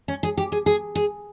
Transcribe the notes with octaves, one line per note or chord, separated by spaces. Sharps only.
C#4
G#4
G4
G#4
G#4
G#4